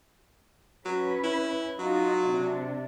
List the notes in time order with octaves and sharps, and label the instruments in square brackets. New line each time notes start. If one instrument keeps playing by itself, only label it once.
[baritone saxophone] F#3 [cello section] C#4 B4
[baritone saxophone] E4
[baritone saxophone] F#3 [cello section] D#4 F4
[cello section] C3 D4